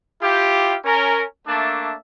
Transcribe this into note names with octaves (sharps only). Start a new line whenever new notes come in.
E4 F4 G4
C#4 A#4
A3 A#3 D4 E5 A5